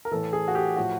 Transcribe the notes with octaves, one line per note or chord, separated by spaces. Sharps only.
A#4
A2 E3 A4
G#4
F#4
G4
A2 F3 F#4